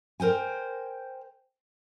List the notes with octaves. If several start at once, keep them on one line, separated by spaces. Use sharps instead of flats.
A#4 C5 G5 G#5